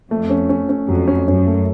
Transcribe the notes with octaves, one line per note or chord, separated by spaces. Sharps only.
F2 A3
C#4
C#4
C#4
F2 F#3
C#4
F#2 C#4
A3